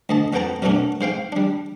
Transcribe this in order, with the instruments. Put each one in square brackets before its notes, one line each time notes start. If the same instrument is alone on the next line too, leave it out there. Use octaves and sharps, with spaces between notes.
[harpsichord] D2 D#5 A5
F2 F#3 B3 G5 A5 A#5
F#2 B2 F#3 A3 C#4 D4
G#2 C5 F5 G5
G3 D4